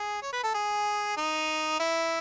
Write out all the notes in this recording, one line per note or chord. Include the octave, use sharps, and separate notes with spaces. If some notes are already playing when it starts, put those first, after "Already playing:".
Already playing: G#4
C#5
B4
A4
G#4
D#4
E4